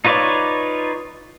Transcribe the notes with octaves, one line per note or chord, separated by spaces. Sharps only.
D#4 F4 B4 C#5 D5